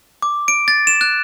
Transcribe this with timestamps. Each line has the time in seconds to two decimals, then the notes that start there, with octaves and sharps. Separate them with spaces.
0.22 D6
0.48 D7
0.68 A6
0.87 E7
1.01 F#6